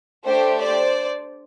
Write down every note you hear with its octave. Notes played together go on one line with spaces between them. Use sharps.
A3 D4 G4 C5
C5 D5